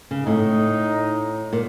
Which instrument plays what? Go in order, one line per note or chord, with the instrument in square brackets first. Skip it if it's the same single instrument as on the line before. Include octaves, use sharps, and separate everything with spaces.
[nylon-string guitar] C#3
[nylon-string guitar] A2 [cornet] D#4
[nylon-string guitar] A#2